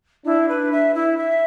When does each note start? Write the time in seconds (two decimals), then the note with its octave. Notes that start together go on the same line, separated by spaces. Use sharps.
0.25 D4 E4
0.49 B4
0.72 E5
0.95 E4
1.17 E5